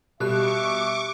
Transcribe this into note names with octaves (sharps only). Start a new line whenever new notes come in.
B2 G3 G4 E5 C#6 D6 F#6